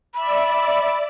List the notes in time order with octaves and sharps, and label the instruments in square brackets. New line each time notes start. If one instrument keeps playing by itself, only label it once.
[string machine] D5 E5 [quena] B5